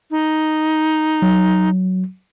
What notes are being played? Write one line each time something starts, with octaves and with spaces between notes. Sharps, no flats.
D#4
F#3